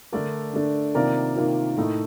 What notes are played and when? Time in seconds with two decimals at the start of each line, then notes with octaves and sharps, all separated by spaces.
0.12 D3 A3 D4 A#4 D5
0.54 D3 A3 D4
0.95 C3 D#3 A#3 F4 A#4 D5
1.36 C3 D#3 A#3 F4
1.77 A2 A3 D#4